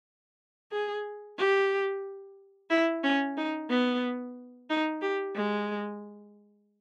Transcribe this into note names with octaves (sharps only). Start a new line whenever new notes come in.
G#4
G4
E4
C#4
D#4
B3
D#4
G4
G#3